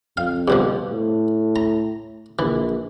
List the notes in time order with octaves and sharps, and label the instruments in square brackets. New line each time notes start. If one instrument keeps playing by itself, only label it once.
[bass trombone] F2 [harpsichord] F5
[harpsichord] G2 B2 F3
[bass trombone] A2
[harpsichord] A#5
[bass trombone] A#1 [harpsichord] E3